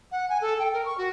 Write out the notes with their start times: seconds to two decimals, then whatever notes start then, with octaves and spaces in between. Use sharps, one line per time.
0.12 F#5
0.30 G#5
0.41 A4
0.59 G5
0.73 A#4
0.85 C#6
0.98 F#4